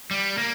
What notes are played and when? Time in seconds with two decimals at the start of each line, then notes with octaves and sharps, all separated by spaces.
0.11 G3
0.38 A#3